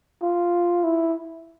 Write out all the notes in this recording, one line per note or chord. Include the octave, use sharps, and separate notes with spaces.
F4
E4